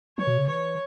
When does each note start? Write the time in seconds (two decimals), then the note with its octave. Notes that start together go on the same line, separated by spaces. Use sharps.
0.18 E3 C#5
0.27 B2
0.37 C#3
0.47 E3 C#5